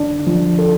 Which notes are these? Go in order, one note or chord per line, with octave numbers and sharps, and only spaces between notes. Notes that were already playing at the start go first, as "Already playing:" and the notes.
Already playing: D3 D4
F3
A4